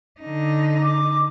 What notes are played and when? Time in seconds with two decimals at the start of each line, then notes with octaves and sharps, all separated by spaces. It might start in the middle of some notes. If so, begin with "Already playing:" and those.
0.20 D3 D#4
0.83 D6